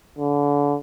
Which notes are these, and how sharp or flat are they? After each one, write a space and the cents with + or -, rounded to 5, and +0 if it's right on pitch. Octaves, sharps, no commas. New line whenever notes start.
D3 -30